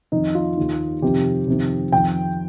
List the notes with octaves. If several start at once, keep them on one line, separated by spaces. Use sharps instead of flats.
F2 D#3 D#4
F4
D#2 D#3
F2 C3 D#3 G4
F2 C3 D#3
F2 D#3 G5